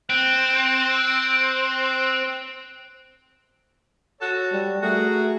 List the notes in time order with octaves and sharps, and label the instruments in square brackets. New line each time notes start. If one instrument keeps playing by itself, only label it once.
[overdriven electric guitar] C4 [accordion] F#6
[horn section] F#4 A4 C#5
[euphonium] G3
[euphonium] A3 [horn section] F#4 G#4 A#4